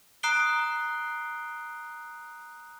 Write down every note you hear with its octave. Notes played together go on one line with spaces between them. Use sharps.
A#5 D#6 F#6 C7 D7 G7